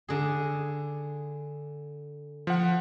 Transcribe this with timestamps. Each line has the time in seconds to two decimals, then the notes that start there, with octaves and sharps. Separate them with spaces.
0.08 D3 G#4
2.47 F3 F#5